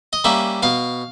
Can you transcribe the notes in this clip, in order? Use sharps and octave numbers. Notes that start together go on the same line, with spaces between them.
D#5
G3 A#3 C#4 E5
B2 F5